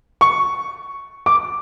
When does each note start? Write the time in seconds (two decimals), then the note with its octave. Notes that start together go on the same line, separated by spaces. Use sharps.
0.21 C#6
1.26 D6